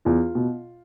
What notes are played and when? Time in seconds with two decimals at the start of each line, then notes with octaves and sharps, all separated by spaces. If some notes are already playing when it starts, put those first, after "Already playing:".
0.05 E2 F4
0.35 B2